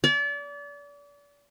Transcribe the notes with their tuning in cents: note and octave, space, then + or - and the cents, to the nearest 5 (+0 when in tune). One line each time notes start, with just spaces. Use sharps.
D5 -35